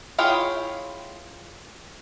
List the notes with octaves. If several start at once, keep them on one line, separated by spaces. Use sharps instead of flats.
E4 F4 G#4 C#5 G5